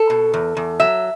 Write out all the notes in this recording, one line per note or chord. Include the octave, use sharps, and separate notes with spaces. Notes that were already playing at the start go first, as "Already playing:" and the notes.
Already playing: A4
B2
E2
E2
F#3 E5